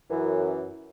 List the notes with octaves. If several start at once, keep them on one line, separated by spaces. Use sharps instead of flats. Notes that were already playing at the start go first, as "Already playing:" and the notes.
F#2 E3